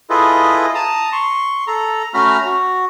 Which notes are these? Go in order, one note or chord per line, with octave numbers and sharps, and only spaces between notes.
E4 F4 G#4 A4 B4 D#5
A5 A#5 D#6
C6 C#6
A4 A#5
A3 C#4 F#4 A#5 B5 F6
F#4